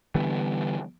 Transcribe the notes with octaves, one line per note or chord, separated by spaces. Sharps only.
D3 E3 G3 B3